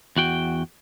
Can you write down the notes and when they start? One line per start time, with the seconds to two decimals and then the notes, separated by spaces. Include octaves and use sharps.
0.17 E2 F#4 G5